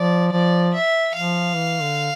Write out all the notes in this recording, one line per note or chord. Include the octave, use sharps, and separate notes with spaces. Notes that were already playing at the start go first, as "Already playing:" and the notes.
Already playing: F3 D5
F3 D5
E5
F3 F5
E3
D3